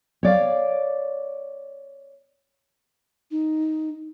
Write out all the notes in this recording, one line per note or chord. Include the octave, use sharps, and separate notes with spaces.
C#5 D5 F5
D#4